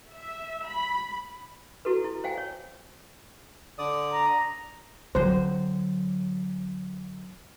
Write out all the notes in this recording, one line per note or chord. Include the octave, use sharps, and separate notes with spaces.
E5
B5
E4 F#4 A4 B4
E4
C5 F5 G5 G#5
C#5
D3 D5 D#6
A#5
D3 F#3 C5